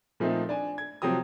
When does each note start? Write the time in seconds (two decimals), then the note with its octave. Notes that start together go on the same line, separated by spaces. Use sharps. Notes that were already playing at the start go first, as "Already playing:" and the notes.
0.20 A#2 F3 A3 C4 D#4
0.49 D4 G#5
0.78 G#6
1.02 C3 F3 F#3 G4 D#6